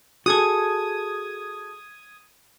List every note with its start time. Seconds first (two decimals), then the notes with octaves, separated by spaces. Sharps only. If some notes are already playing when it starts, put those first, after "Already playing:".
0.26 F#4 G#4 A4 D#6 G#6